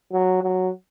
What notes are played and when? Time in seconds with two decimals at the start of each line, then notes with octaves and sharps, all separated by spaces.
0.13 F#3
0.43 F#3